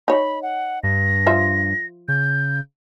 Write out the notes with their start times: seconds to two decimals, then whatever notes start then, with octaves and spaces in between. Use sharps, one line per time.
0.08 D#4 C#5 B5
0.42 F#5
0.83 G2 A#6
1.26 F3 F4 E5
2.08 C#3 G6